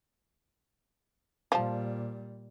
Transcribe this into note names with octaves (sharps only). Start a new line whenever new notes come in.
A#2 F3 G3 A5